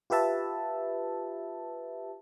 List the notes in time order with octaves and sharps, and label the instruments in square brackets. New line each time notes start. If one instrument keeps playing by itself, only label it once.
[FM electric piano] F4 G4 B4 E5 A5